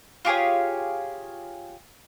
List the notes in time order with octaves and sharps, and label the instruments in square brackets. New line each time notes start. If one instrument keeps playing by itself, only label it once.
[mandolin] F4 G4 G#4 C#5